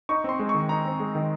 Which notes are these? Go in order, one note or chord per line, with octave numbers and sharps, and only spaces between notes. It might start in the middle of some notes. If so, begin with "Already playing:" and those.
D#4 C#6
C4 C6
G#3
C#6
D#3
D#4 A#5
C4
G#3
D#3